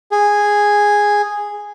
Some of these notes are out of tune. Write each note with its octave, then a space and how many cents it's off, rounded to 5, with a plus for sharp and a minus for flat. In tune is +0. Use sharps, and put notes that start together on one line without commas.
G#4 -5